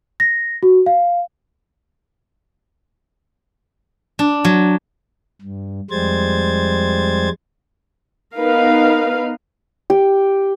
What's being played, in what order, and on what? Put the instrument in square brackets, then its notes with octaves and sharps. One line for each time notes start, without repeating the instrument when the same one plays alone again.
[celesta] A#6
F#4
F5
[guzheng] D4
F#3
[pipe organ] G2
F2 G3 G#3 C5 G#6 A6
[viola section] B3 D#4 A#4 B4 F5
[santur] G4